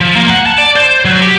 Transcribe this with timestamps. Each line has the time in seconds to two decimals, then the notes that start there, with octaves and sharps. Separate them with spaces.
0.01 F3
0.16 A#3
0.30 F#5
0.46 A5
0.58 D5
0.76 C5
1.05 F#3
1.21 G4